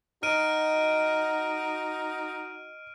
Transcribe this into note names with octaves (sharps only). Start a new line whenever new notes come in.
D#4 F#4 D#5 F6 D7 D#7